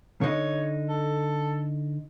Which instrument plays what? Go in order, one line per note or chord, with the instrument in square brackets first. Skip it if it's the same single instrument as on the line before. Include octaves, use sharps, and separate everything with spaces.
[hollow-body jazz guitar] D3 D#4 [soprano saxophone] C#5
[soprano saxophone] A4